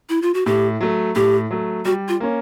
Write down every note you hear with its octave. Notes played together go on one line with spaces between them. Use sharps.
E4
F4
F#4
A2 G4
F#3 A3
A2 G4
F#3 A3
G3 F#4
F4
A#3 C#4